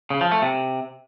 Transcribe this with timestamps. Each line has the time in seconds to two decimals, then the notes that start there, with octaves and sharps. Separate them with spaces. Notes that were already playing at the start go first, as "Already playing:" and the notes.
0.10 C#3
0.21 F3
0.32 A3
0.42 C3